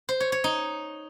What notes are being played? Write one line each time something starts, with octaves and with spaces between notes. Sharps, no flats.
C5
C#5
C#5
D#4